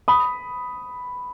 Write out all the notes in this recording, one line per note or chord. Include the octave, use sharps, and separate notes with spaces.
B5 D#6